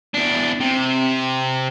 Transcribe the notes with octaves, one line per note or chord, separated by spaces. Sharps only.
E2 D4
C3